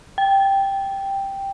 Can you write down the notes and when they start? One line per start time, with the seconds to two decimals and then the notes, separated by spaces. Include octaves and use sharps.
0.18 G5